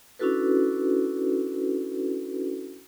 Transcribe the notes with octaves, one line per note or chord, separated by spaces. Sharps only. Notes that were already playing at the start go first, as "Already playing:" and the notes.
C#4 D4 E4 F#4 A4 B4